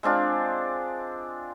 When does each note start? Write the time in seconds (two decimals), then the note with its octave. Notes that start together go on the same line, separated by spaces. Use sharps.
0.03 G#3 C4 D4 F4